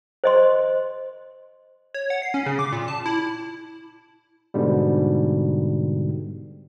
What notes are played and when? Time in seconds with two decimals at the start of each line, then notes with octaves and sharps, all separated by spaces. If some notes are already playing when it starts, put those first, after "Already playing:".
0.24 C5 D#5 C6
1.94 C#5
2.10 F#5
2.22 C7
2.34 C#4
2.46 C#3
2.59 D6
2.72 A#2
2.88 A5
3.06 E4
4.54 G#2 B2 D3 G3